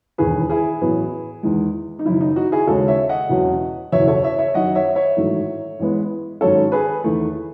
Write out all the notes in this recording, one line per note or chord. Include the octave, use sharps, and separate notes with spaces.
E1 D#2 D#3 G#4 B4
E4 G#4
A1 A2 F#3 B3
E2 D#3 G#3
D#4
F#1 F#2 D#3 E4
D#4
D#4 F#4
E4 G#4
D#2 C#3 G#3 C#4 F#4 A4
C#5 E5
D#5 F#5
E1 E2 B2 F#3 C#4
F#1 E2 B2 C#5 E5
A4 C#5
C#5 E5
C#5 E5
F#2 D#3 F#3 D#5 F#5
C#5 E5
C#5 E5
A1 G#2 D#3 F#3 A3
A1 A2 G#3 B3
G#1 G#2 F#3 C#4 A4 C#5
G#4 B4
E2 D#3 A3